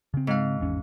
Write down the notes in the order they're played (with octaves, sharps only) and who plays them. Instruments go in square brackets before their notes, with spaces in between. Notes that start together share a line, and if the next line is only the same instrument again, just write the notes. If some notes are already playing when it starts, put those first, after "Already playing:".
[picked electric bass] C#3 C4
[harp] G#2 F5
[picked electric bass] G#1 E2 C#4